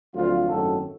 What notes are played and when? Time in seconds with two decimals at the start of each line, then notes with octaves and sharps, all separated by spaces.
0.14 D2 F3 F#3 C4 F4
0.48 G#1 F#2 A2 D#3 F#3 A4